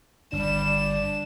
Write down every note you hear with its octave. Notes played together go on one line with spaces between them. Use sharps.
G1 G3 D4 E7